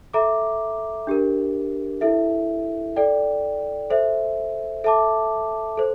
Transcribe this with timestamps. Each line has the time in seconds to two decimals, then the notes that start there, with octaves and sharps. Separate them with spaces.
0.14 A4 E5 A#5 D6
1.07 D4 G4 A#4
2.01 E4 A4 E5
2.96 A4 D5 G5
3.90 A4 C5 E5
4.84 A4 E5 A5 D6
5.77 A4 C5